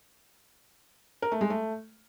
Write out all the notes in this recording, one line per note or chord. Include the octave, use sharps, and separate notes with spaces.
A#4
A3
G#3
A3